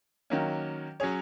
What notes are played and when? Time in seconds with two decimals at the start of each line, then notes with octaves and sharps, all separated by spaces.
0.30 D#3 F#3 A#3 C#4
1.00 F#3 C#4 G#4 C#5